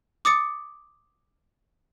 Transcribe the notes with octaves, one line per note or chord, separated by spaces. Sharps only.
D6 D#6 A6 C#7